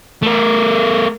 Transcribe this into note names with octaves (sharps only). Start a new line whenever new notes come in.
A3 A#4